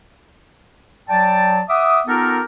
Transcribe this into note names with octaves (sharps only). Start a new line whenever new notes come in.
F#3 D5 G5 A5
E5 F#5 D6 D#6
B3 D#4 F4 G4 A4 A#4